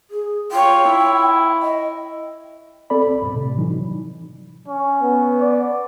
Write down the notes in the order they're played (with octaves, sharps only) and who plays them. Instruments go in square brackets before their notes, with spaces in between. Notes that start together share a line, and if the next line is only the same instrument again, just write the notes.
[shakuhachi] G#4
[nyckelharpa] F4 C#5 [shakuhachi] G5
[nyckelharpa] E4
[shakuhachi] D#5
[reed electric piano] C4 A4 D5 B5
C2
G2 B2
A2 C3
E3 F#3 D#4
[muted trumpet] C#4
[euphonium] B3
[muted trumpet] D5